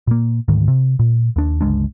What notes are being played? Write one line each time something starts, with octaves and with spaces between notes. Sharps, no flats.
A#2 A#3
D2 G#2 D#3
C3
A#2
D#2 D4
G1 C#2 G#3 D4